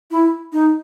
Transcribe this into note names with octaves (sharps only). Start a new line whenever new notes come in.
E4
D#4